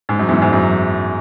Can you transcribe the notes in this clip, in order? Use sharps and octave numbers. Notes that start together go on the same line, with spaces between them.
G#2
F#2
E2 G#2
G#2
F#2